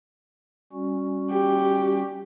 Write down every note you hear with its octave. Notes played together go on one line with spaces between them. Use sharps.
G3 C#4 F#4
G4